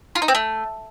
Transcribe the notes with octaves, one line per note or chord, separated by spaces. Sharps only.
F4
D#4
C4
A3